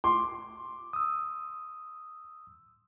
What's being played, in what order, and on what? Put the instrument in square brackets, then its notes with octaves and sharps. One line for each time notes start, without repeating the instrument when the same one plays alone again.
[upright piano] C6 [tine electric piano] D6
[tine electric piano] D#6 E6